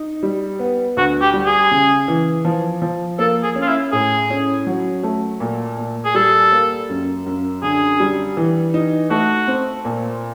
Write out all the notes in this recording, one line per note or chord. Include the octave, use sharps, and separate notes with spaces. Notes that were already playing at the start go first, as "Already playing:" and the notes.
Already playing: D#4
G3
B3
D2 F#4
G4
G3
G#4
C#3
E3
F3
F3
A#3 A4
G#4
C#4
F4
E4
A2 G#4
C#4
F#3
A3
A#2
A#2
G#4
G3 A4
A#3
F#2
F#2
D3 G#4
G3
E3
D#4
A3 F#4
C4
A#2